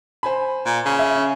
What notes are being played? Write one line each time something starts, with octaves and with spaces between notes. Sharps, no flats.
C5 G#5 B5
A#2
C#3
E5
C#4